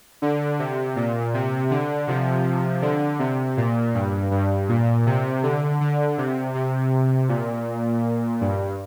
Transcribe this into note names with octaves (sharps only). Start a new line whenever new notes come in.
D3
C3
A#2
C3
D3
C3 F3
D3
C3
A#2
G2
G2
A#2
C3
D3
D3
C3
C3
A#2
G2